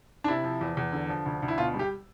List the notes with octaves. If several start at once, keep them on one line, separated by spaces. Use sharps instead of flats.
D4
C3 E4
F3
E2
E2
D3
F3
D2
D2
E4
B2 F4
G3
G4